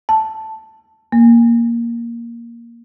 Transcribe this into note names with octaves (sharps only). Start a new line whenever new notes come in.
A5
A#3